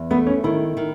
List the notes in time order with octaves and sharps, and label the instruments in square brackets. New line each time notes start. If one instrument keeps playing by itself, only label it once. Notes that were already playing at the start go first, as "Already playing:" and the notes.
Already playing: [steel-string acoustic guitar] E2
[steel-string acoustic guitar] A3 [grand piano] B3
[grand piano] C#4
[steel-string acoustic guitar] D#3 [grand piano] E4
[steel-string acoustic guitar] D#3